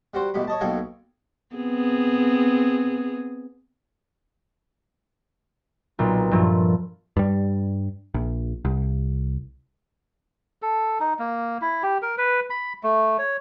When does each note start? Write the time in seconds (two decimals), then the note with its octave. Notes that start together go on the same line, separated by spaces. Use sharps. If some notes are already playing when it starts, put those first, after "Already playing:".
0.14 G3 F#4 C5
0.34 A1 B2 G4 B5
0.47 C#5 D#5 A5
0.61 B1 B2 A#3 A4 G5 G#5
1.55 B3 C4 G#4
5.99 B1 A#2
6.31 G2 A#2 F3 A3
7.17 G2 G3
8.14 A#1
8.65 C2
10.62 A4
11.00 D#4
11.19 A#3
11.62 E4
11.83 G4
12.02 A#4
12.18 B4
12.50 B5
12.83 A3
13.19 C#5